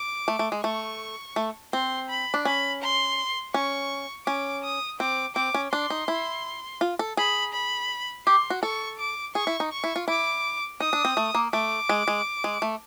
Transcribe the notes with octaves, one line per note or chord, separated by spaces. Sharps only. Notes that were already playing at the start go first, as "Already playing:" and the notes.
Already playing: D6
A3
A3
G#3
A3 C#6
A3
C4 C6
B5
D4
C#4 B5
C6
C#4 C#6
C#4 D6
D#6
C4 D6
C4 D6
C#4
D4 C6
D#4
E4
F4
A4
G#4 B5
B5
G4 C6
F#4
A4 C#6
D6
G#4 C#6
E4
D#4
C#6
E4
F4
E4 D6
D#4 D#6
D4
C4
A3
A#3
A3 D6
G#3
G#3
G#3
A3